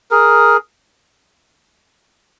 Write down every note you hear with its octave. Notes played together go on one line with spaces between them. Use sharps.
G#4 A#4